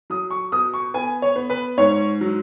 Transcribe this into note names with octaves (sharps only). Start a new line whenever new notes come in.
F#3 D#6
C#6
B2 D#6
C#6
B3 G#5
C#5
B3
B4
G#2 C#5
F#3